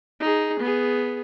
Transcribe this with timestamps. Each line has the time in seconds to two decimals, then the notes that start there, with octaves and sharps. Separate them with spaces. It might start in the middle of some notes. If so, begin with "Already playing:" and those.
0.20 D#4 G#4
0.60 B3 G#4